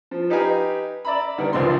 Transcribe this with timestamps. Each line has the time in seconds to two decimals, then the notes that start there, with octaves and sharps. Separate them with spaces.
0.11 F3
0.30 D#4 G4 B4 F5 G#5 A#5
1.05 D5 E5 A#5 B5
1.38 D3 D#3 G3 B3 A#4
1.53 G#1 C#2 G2 F3 C6